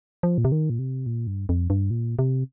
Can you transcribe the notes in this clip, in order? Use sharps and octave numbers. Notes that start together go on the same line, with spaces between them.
F3
A#2
C3
D#3
A#2
C3
A#2
G2
F2
G2
A#2
C3